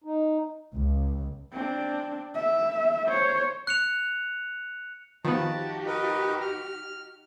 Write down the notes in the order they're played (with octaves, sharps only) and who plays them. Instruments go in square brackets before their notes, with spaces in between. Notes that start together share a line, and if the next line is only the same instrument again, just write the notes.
[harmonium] D#4
[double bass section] C#2
[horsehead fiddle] C4 D4
E5
C5 C#5
[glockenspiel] F#6 C#7 F7
[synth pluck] D#3 B3 [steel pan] F3 [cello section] D#4 F#4 G4 [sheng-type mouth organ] A5
[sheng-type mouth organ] A#4 B4 D#5
F6